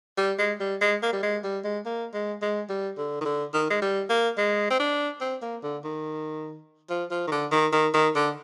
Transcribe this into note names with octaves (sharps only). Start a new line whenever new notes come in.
G3
G#3
G3
G#3
A#3
G3
G#3
G3
G#3
A#3
G#3
G#3
G3
D3
D#3
D3
D#3
G#3
G3
A#3
G#3
C4
D4
C4
A#3
D3
D#3
F3
F3
D#3
D3
D#3
D#3
D#3
D3